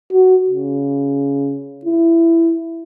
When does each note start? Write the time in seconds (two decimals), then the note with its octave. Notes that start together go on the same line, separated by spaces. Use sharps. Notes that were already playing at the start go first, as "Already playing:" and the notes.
0.12 F#4
0.50 C#3
1.85 E4